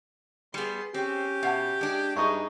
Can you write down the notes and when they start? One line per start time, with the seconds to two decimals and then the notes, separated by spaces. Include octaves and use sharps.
0.54 G3 B3 G#4 C6
0.94 C4 C#4 G4
1.43 B2 E5 F#5 A5
1.81 G#3 D4
2.16 G2 D#4 G#4 E5 C#6